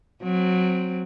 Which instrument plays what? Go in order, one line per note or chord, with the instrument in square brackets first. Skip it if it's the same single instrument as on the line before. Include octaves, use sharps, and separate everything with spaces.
[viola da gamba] F#3 C4